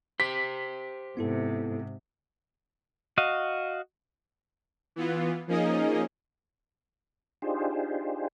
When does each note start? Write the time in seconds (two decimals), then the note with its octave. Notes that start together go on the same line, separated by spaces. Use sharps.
0.20 G4 C5 B6
1.17 G#2 C3 B3 E4 A4
3.18 F#4 D#5 F5
4.96 E3 B3 F4
5.48 F3 A#3 C#4 D#4 G#4 D#5
7.42 D4 D#4 F4 G4 G#4 C5